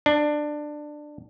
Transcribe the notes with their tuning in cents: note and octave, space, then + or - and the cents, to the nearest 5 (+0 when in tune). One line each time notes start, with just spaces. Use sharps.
D4 +15